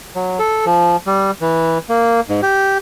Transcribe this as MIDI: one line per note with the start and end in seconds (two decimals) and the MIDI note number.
0.15 0.39 54
0.39 0.65 69
0.66 0.96 53
1.06 1.31 55
1.41 1.78 52
1.89 2.21 58
2.29 2.41 44
2.43 2.78 67